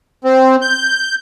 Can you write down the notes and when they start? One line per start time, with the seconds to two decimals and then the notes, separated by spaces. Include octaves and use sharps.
0.24 C4
0.62 G6